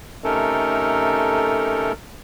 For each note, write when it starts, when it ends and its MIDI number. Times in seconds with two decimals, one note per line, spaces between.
0.24 1.92 48
0.24 1.92 57
0.24 1.92 61
0.24 1.92 63
0.24 1.92 69
0.24 1.92 70